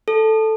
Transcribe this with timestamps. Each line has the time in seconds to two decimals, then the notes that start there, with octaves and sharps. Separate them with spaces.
0.08 A4